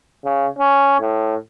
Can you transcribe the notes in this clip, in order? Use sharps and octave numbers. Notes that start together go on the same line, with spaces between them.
C#3
C#4
A2